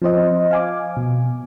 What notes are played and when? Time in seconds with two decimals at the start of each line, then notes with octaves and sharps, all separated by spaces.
0.02 F3 C4 C5 D#5
0.51 F5 G#5 D6
0.97 B2